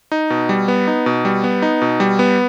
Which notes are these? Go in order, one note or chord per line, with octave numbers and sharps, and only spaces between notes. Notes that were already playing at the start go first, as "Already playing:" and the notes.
D#4
B2
G3
B3
D#4
B2
G3
B3
D#4
B2
G3
B3